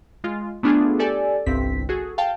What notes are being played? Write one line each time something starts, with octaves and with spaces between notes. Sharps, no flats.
G#3 F4
A3 B3 D4 F4 G#4 A4
G4 A4 D5 G#5 A5
G1 C2 G2 C4 B6
F#4 G#4 A4
F5 G5 A5